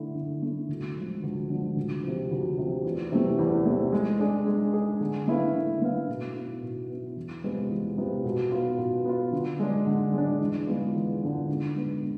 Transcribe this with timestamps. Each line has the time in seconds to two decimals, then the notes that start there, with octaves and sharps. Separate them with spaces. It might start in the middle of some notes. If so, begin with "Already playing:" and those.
Already playing: D3 A3 E4
0.15 D3
0.42 A3 E4
0.69 D2
0.96 D3 F3 G#3
1.23 D2
1.50 D3 F3 G#3
1.77 D2
2.03 C3 F3
2.31 D2
2.58 C3 F3
2.84 E2
3.12 C3 E3 A3
3.39 E2
3.66 C3 E3 A3
3.92 G#3
4.20 D4 G#4
4.47 G#3
4.74 D4 G#4
5.01 D3
5.28 A3 E4 B4 F5
5.55 D3
5.82 A3 E4 B4 F5
6.09 B2
6.35 B3 E4
6.63 B2
6.90 B3 E4
7.17 E2
7.44 C3 G#3 B3 F4
7.71 E2
7.98 C3 G#3 B3 F4
8.25 B2
8.52 B3 F4
8.78 B2
9.05 B3 F4
9.32 D3
9.60 G#3 D4
9.87 D3
10.13 G#3 D4
10.40 E2
10.67 D3 G#3 B3 F4
10.95 E2
11.22 D3 G#3 B3 F4
11.49 D3
11.75 G#3 B3
12.02 D3